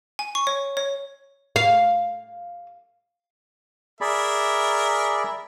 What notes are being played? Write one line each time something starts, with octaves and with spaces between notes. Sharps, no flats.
G#5
C#6
C#5
C#5
F5
G#4 A#4 D5 E5 B5